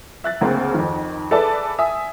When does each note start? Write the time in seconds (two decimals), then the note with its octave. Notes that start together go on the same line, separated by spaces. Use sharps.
0.24 E5 F#6 A6
0.41 D2 C#3 A#3 C4
0.74 F2 D#3
1.31 G#4 A4 B4 D5 E5 A5
1.79 E5 G#5 D#6